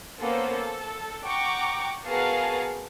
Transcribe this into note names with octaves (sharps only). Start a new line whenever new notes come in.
A#3 B3 C#4 A4 C5
A4
F#5 G5 A#5 C#6 D6
B3 F#4 G#4 A#4 F5 A5